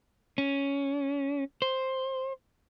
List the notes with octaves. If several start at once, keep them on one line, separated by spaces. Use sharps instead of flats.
C#4
C5